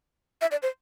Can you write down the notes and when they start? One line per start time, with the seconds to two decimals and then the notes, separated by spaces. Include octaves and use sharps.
0.41 E5
0.51 D5
0.62 C5